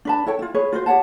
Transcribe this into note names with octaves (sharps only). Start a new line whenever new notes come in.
D4 B4 A5
E4 A4 C#5 G5
E4 F4
G#4 B4 C#5
F4 F#4 C5
G4 C#5 F#5 A5